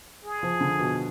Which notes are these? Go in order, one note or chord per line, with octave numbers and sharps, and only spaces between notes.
G#4
F3
D3
B2